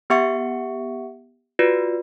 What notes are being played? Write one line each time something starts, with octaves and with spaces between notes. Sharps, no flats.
B3 G4 E5 F#5 C#6 C#7
F4 F#4 B4 D5